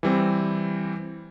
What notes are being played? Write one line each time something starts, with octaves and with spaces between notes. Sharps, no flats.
E3 G3 C4